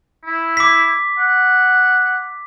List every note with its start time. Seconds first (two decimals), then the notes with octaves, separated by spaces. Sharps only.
0.26 E4
0.57 D6 B6
1.18 F#5